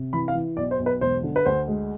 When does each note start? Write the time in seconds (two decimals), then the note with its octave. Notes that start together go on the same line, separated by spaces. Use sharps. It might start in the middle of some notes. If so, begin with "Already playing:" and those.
Already playing: C3
0.13 E3 B5
0.28 F5
0.35 E3
0.57 B1 D5
0.71 C5
0.79 B1
0.86 B4
1.01 E1 C5
1.23 D3
1.36 B4
1.46 D2 C5
1.68 G#3